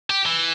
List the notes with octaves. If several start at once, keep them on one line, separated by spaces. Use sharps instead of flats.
G4
E3